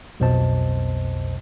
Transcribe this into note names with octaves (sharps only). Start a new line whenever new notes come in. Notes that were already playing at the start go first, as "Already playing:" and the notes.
B1 F2 B2 C5 D#5 A5